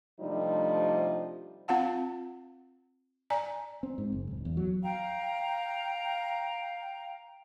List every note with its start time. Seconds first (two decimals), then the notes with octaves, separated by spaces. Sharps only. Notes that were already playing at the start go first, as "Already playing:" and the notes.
0.20 C3 F3 G3 A3 D4 D#4
1.68 C4 F4 F5 F#5 A5
3.30 D5 G#5 A#5
3.83 C4
3.98 G#2
4.12 F#1
4.31 D1
4.45 E2
4.57 F#3
4.82 F5 G5 A#5